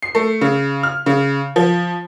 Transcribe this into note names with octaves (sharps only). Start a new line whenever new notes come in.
C7
A3
C#3
F6
C#3
F3